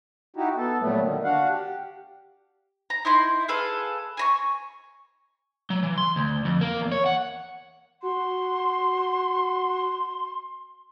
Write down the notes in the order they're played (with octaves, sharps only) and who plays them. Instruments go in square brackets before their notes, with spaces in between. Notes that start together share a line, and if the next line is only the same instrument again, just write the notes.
[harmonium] D#4 E4 F#4 G4
B3 A4
A#2 F#3 G3 A3 B3
D3 D#3
D4 F#4 F5 F#5
G4
[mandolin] A#5
D#4 E4 C6
G#4 A4 B4 F5
G#5 A#5 C#6
[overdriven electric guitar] F#3
E3
C6
D2
F2
A#3
E2
C#5
F#5
[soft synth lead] F#4 [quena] C6